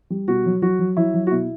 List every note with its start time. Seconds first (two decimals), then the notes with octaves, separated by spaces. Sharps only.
0.10 G3
0.28 B2 F#4
0.46 F#3
0.62 F#3 F#4
0.79 F#3
0.97 F#3 E4
1.14 F#3
1.27 F#4
1.31 B2 E4